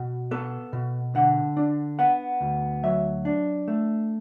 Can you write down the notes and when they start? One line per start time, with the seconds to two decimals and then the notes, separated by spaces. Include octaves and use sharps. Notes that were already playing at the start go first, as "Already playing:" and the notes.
Already playing: B2 F#4
0.31 B3 A4
0.73 B2
1.15 D3 F#5
1.57 D4
1.99 B3 F#5
2.41 D2
2.83 F#3 E5
3.25 D4
3.68 A3